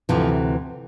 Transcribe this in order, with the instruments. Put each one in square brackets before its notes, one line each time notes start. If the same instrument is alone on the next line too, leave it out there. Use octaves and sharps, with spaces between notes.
[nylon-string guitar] D2 C3 E3 F3